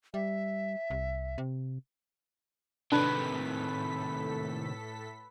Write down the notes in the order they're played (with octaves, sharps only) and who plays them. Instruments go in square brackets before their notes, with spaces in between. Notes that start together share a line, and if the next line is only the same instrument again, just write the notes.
[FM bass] G3 [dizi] E5
[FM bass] C2
C3
[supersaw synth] A2 A4 B6 [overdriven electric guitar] C3 D#3 [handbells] D4 [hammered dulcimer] B4